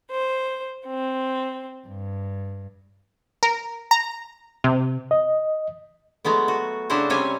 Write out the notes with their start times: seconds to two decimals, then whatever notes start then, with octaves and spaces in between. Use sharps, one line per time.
0.11 C5
0.88 C4
1.88 G2
3.43 A#4
3.91 A#5
4.64 C3
5.11 D#5
6.25 F#3 G#3 A3 B3
6.48 F#4
6.90 C#3 D4 E4 F#4 C5
7.10 C3 G3 C4 C#4 C#5 G#5